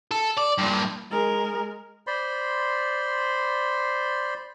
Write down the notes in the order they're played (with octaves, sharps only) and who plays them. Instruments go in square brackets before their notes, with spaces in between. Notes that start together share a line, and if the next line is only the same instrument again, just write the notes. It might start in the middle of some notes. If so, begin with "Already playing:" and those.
[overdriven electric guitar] A4
D5
G2 A#2
[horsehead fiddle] G#3 A#4
[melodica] C5 D5 B5 C6